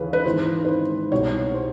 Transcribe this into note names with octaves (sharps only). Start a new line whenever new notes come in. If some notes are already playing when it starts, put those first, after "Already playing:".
Already playing: D#2 C#3 E3 B4
B4
G#1 G#2 E3 C5
B4
C5
C2 B2 C#5
C5